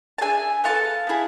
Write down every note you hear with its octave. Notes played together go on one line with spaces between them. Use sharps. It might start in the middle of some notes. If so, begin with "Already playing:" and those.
A5
D4 G#4 E5 G#5
B3 F4 F5 A5
A4
B3 E4 G#4